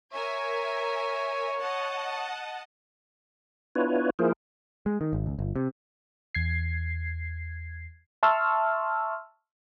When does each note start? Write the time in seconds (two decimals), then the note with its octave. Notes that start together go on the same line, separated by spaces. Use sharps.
0.13 A#4 C#5 E5 G#5
1.58 D#5 F#5 A5
3.75 B3 D4 E4 F4 B4 C#5
4.19 F3 A#3 E4 G#4 A#4 C5
4.86 G#3
5.01 D#3
5.13 G#1
5.26 C#2
5.39 G1
5.56 C3
6.35 E2 G#6 C7
8.23 E5 A5 C6 C#6 E6 F6